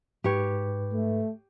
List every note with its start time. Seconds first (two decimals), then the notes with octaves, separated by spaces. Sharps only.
0.24 G#2 G4 B4 C#5
0.93 A3